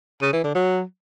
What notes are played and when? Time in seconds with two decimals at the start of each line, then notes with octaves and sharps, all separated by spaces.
0.22 C#3
0.33 E3
0.44 D3
0.55 F#3